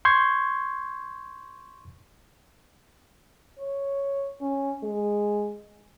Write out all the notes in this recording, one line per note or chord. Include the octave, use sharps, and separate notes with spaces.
C6 C#6 G6 G#6
C#5
C#4
G#3